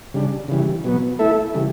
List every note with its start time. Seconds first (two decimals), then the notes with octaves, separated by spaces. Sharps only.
0.14 C#3 G3 D4
0.48 C#3 E3 G3
0.84 B2 F#3 B3
1.19 A3 E4 A4 E5
1.54 C#3 E3 G3